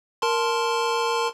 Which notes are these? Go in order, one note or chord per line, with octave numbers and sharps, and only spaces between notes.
A#4 A5 C6